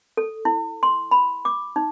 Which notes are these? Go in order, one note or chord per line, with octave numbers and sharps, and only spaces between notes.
A4
E4
C6
B5
D6
D#4